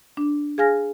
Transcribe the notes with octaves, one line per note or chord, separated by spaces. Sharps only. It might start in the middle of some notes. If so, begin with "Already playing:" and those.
D4
G#4 F5 G#5 F6 A#6